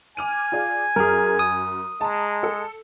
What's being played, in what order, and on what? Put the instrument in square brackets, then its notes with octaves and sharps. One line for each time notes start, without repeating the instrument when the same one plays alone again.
[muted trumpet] G#5 [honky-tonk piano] D6 F6 D#7
[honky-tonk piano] F4 G#4 D5
[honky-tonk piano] F#2 F6 [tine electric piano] G#4 A#4
[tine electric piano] D#6
[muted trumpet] G#3 [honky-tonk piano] A5 A#5
[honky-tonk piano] A4